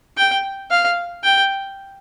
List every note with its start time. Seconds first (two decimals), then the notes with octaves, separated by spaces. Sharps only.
0.17 G5
0.71 F5
1.24 G5